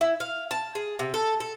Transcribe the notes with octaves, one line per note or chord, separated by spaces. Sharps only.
E4
F5
A5
G#4
C3
A4
A4